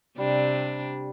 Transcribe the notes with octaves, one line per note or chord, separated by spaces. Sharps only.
C3 G3 D4